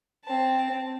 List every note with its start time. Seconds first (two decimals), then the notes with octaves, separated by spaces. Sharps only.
0.25 C4 A5